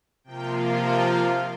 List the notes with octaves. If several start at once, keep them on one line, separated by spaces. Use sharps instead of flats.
C3 F3 A#3 F4 G5
F5
G5
F5